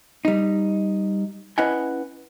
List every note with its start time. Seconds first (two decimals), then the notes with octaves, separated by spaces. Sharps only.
0.25 G3 D#4
1.58 C#4 E4 B4 D#5 F#5 G#5